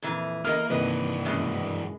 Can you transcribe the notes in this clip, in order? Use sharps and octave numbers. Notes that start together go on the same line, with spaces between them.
F2 A#2 E3
E2 A#3 A#4 D#5 F6
G2 C3 D#3 E3 A#3 B4 D#5
F#2 B2 G#3